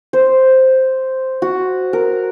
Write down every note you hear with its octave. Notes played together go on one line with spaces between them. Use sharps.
C5
F#4
A#4